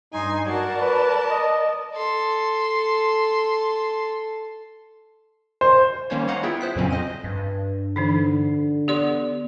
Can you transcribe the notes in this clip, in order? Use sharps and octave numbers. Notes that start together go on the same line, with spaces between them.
G2 D#4 G#5 C6
F#4 A#4 D5 A5
B4
D#5
A4 C6
C5
D#3 G3 A#3 C#4 C5 C#5
C#5 D#5 F5 F#5 A#5
B3 E4 F4 G#4 E5 G5
C5 F#6 B6
F2 A#2 C#3 F#3 C4 C#4
C5 D#5 D#7
G2
D3 E3 D4 D#4
B3 G4 D5 C6